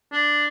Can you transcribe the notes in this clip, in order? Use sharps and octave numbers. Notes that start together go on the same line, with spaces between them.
D4